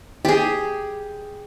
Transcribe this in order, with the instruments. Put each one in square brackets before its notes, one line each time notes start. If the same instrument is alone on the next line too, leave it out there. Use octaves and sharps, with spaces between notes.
[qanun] G4 G#4